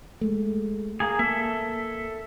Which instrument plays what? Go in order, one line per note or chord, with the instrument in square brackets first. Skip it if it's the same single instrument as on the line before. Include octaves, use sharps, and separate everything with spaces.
[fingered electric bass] G#3 A3
[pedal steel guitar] A#3 G#4
[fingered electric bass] A#3 [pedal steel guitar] A4 E5